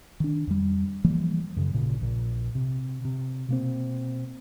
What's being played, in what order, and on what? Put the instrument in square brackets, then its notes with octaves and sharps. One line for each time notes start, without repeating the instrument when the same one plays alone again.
[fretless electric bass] D#3 D4
F2 G3
E3 F3 G3 A#3
[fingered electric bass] F#2 C#3
G#1 A#2 C#3
A#1 A#2
C3
C3
B2 A#3 C4